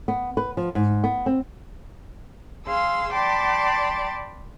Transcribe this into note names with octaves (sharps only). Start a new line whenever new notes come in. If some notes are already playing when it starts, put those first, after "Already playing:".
B3
B4
F3
G#2
B3
C4
G#4 F5 C6 E6
D5 G5 A5 B5 C6 D6